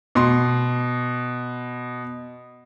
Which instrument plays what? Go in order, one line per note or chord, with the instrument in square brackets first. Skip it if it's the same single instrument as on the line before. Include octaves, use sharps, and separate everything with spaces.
[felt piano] B2 C6